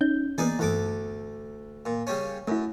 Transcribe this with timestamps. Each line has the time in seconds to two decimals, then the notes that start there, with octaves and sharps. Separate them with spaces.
0.01 C#4 D#4 G6
0.38 E3 A#3 B3 D#4 G#4 D5
0.59 D2 G2 E3 A4 D6
1.86 A#2
2.07 C#3 G3 C#4
2.48 F#2 A3 E4